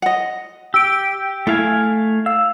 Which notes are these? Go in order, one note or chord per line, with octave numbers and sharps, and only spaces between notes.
D#5 F#5
G4 E6 D7
A3 E4 F5 G#5
F5 E6